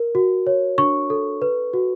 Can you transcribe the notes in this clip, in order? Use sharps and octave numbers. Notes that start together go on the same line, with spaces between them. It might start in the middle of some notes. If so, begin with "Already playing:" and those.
Already playing: A#4
F#4
C#5
D4 C#6
A4
B4
F#4